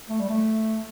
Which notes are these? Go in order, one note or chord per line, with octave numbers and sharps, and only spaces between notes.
A3
G3
A3